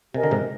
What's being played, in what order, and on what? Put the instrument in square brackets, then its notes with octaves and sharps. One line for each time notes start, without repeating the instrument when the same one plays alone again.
[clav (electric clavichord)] C3 [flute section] G4 A#4 D#5 G#5
[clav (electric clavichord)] D3
G#2 C3